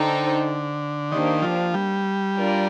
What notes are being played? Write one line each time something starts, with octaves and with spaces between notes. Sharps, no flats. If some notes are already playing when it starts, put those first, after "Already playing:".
Already playing: D3 D#4 A4 C5 G5
D#3 A#3 D4 G4 C5
F3
G3
D4 F4 A#4 D5